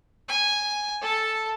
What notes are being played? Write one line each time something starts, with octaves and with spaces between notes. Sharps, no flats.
G#5
A4 A5